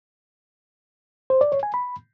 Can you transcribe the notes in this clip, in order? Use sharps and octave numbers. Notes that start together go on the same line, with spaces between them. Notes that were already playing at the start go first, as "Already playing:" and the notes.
C5
D5
C#5
G#5
B5